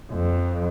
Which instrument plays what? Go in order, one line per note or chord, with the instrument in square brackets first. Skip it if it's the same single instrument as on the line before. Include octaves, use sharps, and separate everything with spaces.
[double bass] F2